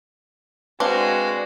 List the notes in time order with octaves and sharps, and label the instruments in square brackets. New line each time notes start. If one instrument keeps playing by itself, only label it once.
[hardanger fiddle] G#3 F#4 [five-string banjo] C4 D4 C5 [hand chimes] B4 F5